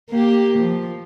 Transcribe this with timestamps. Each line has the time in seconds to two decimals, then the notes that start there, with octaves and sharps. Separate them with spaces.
0.10 A#3 G4
0.59 F3